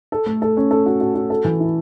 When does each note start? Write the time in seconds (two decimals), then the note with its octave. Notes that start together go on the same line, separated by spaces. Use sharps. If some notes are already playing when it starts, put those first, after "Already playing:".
0.12 A4
0.26 A3
0.42 A4
0.57 C#4
0.71 A4
0.86 F#4
1.01 F#4
1.15 F#4
1.30 A4
1.44 E3
1.60 E4